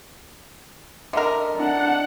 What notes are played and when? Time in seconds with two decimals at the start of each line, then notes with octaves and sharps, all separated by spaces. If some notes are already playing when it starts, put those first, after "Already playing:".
1.13 D3 A#4 D#5 E5
1.56 D4 F#5